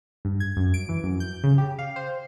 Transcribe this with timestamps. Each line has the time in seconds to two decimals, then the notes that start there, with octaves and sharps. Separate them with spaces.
0.25 G2
0.40 G#6
0.57 F#2
0.74 D7
0.89 E3
1.04 F#2
1.20 G6
1.44 C#3
1.58 G4
1.79 F5
1.96 C5